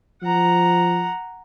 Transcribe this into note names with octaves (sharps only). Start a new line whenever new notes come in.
F3 F#5 A#5